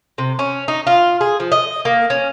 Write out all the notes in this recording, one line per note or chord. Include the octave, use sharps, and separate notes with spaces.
C3
C#4
D#4
F4
G#4
F3
D#5
A#3
C#4